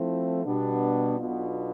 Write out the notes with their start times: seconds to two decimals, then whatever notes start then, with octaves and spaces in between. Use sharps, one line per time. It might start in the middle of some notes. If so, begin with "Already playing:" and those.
Already playing: F3 A3 C4 E4
0.44 B2 G3 B3 D4
1.17 B1 B2 B3 D4 F4